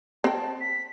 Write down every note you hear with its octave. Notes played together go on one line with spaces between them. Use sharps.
C4 G5 A5
B6